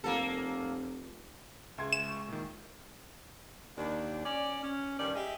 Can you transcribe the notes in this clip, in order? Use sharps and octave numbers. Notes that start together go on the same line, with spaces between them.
F1 A#3 A4
C#2 G#4 E5 C6 G#6
G#3 E7
C#6 G6
A#2 D#3
D#2 D4
C#4 D5
C#4
G2 D#3 C#4 D5
G4 G#4 D#5 E5